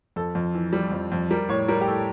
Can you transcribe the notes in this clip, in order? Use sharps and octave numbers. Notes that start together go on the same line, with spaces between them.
F2 A4
F2
E3
G3
F2
F2
G3 A#4
A2 C#5
G3 A#4
G4
A2 A4